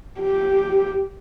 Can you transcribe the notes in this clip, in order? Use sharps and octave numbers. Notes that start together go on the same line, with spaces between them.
G4